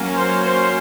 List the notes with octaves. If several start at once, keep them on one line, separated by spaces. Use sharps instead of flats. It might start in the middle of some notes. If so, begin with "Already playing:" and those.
Already playing: F#3 A#3 C#4
C5
C5